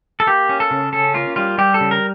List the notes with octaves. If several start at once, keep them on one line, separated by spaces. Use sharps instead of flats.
A4
A#3 G4
C#4
A4
C#3
C#4 A4
A#3 F4
G3 F4
G3 G4
A4
C#3
A#4